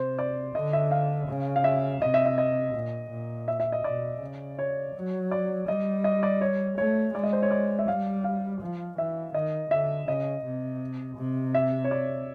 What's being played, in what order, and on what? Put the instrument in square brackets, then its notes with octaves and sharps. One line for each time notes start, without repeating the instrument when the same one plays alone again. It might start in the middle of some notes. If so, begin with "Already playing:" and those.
Already playing: [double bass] C3 [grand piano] C5
[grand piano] D5
[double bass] D3 [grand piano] D#5
[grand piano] E5
F5
[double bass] C#3
[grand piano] F5
E5
[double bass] C3 [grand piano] D#5
[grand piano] E5
E5
D#5
[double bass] A#2
A#2
[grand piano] E5
E5
D#5
[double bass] B2 [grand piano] D5
[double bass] C#3
[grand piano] C#5
[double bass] F#3
[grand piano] D5
[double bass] G3 [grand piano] D#5
[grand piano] D#5
D5
C#5
[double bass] A3 [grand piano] C#5
[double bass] G#3 [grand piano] D5
[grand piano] D#5
C5
C#5
D5
E5
[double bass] G3 [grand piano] F5
[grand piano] F5
[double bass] F3
[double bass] E3 [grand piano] E5
[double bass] D#3 [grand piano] D#5
[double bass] D3 [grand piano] E5
[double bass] C#3 [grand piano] D#5
[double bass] C3
C3
[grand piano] E5
C#5
D5